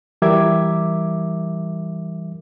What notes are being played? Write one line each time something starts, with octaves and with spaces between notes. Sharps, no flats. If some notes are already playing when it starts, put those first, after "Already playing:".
E3 G3 A#4 E5 D6 G#6